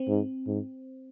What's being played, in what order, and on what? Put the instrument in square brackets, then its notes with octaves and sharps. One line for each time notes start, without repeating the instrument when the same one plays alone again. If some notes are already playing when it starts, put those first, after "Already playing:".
Already playing: [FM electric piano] C4
[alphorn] G#2
G#2